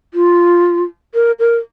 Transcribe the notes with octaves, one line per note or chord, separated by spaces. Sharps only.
F4
A#4
A#4